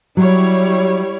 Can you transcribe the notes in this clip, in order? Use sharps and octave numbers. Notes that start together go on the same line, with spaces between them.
F#3 G3 E4 C#5